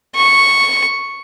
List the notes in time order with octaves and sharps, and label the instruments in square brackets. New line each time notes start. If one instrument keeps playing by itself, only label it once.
[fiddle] C#6